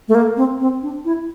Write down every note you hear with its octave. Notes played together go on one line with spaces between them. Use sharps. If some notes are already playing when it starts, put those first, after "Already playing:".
A3
A#3
C4
C4
D4
E4